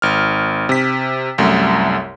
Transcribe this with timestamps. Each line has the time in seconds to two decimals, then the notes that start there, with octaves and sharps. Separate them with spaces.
0.02 G#1 F6
0.69 C3 B6
1.38 C2 F#2 A3